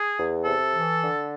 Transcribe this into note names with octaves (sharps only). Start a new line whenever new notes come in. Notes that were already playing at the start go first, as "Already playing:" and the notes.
Already playing: G#4
E2
C3 A4
E3
D3